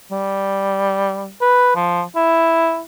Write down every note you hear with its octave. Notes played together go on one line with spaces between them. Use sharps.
G3
B4
F3
E4